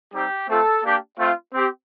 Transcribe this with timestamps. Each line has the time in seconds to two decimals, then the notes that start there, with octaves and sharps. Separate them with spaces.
0.13 G3 C4 D#4 G4
0.48 A3 C4 F4 A4
0.83 A#3 D4 G4
1.18 A3 C4 F4
1.53 C4 G4